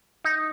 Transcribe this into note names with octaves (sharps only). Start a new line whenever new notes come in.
D#4